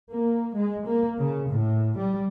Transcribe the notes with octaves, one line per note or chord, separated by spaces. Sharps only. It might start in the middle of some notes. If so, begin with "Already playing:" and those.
A#3
G#3
A#3
C#3
A2
G3